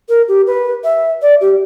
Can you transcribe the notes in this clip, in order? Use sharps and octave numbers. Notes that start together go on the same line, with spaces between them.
A#4
G4
B4
E5
D5
G4